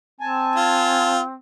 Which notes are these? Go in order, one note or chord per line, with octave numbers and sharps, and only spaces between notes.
C4 G#5 A5
F4